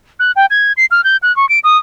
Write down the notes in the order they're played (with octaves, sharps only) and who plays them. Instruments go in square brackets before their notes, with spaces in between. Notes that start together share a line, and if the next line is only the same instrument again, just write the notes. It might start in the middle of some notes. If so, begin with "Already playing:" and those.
[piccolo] F#6
G5
G#6
C7
F6
G6
F#6
C#6
D7
D#6